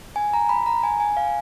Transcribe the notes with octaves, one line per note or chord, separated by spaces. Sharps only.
G#5
A#5
B5
A#5
G#5
G#5
F5